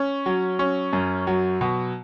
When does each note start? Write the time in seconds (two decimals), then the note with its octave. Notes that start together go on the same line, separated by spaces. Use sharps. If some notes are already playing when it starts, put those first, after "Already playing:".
Already playing: C#4
0.26 F#3
0.59 C#4
0.93 F#2
1.27 F#3
1.61 B2